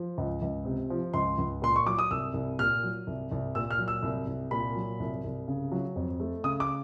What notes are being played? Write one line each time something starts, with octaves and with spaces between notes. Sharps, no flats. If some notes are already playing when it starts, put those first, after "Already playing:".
Already playing: F3
C#2
C#2
C3
F3
C#2 C6
C#2
A#2 C6
C#6
F#3 D6
D#6
C2 E6
C2
A#2 F6
F#3
C2
C2
A#2 E6
F6
F#3
E6
C2
C2
A#2 B5
F#3
C2
C2
C#3
F#3
F2
A3
C#3 D#6
D6